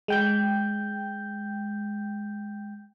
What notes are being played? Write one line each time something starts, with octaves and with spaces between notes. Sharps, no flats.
G#3 G5 G6